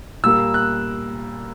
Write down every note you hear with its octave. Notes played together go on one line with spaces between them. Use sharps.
A#2 G3 A#3 E6
F#6